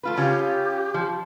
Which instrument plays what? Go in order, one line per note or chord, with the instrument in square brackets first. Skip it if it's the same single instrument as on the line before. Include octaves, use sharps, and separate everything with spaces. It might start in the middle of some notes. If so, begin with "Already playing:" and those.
[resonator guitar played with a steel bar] A3 F4 B4
[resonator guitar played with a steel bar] C#3 C#4 F4 [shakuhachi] G4
[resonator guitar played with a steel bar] F3